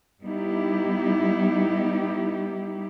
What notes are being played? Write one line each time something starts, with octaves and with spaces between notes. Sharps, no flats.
G3 B3 D#4 E4 G4